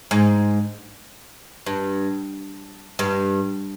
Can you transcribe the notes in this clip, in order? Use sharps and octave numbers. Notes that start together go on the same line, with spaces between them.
G#2
G2
G2